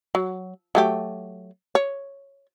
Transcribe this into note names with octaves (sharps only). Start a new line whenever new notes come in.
F#3
F#3 A3 G4
C#5